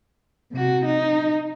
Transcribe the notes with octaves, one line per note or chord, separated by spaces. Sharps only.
C3 F#4
D#4